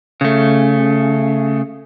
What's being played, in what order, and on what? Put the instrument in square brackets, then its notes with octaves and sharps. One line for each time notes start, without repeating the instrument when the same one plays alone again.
[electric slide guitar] C#3 A3